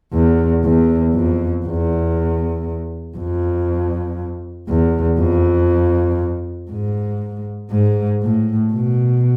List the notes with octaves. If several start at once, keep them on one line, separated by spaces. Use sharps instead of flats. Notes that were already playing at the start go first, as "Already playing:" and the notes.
E2
E2
F2
E2
F2
E2
F2
G#2
G#2
A2
B2